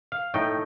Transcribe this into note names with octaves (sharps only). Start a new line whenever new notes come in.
F5
A2 A3 D#4 G5